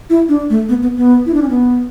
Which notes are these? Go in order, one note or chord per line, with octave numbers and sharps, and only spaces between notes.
E4
D4
A3
B3
B3
B3
E4
D4
C#4
B3